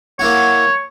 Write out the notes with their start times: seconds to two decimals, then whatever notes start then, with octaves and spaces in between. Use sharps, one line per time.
0.19 A#3 E4 F#4 C#5